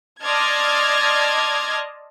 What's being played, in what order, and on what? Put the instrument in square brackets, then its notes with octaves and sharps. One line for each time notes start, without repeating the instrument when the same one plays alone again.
[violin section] D5 D#5 A5 C6 F6 G#6